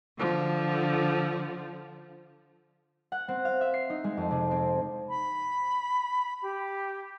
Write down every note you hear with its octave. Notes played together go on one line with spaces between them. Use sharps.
D3 F3
F#5
C4
F5
E5
C7
D#4
G#3
F2
C3
C4
B5
G4